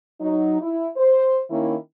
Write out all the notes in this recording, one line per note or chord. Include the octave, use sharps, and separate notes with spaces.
F#3 D#4
E4
C5
D#3 A#3 C#4 E4